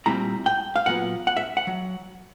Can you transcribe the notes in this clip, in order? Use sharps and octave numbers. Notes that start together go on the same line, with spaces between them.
A#2 G3 C4 E4 A#5
G5
F5
A#2 F#3 B3 F#5
F#5
E5
F#5
F#3